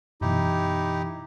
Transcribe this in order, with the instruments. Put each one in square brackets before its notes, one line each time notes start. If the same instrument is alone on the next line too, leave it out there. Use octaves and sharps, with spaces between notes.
[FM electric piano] F#2 B2 E3 [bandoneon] D#4 E4 G4